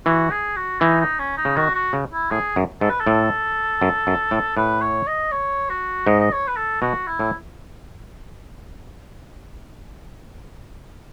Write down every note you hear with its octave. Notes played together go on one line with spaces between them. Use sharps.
E3 F#4
G#4
F#4
E3 D#4
D#4
C#4
D#4
C#3
D#3 F#4
F#4
C#3
E4
A2 G#4
F#2
G#2 A4
B4
A4
A2
F#2
F#2
A2
A2 B4
C#5
D#5
C#5
F#4
G#2 D#5
D#5
C#5
B4
A4
B2 F#4
E4
A2